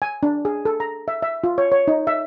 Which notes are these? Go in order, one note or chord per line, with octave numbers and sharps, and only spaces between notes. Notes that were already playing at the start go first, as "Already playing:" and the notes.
G#5
D4
G#4
A4
A#5
E5
E5
F4
C#5
C#5
D#4
E5